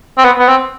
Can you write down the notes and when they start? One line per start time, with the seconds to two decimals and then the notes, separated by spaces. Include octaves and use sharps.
0.18 C4
0.24 B3
0.39 B3
0.48 C4